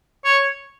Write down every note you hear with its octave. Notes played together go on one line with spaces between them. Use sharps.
C#5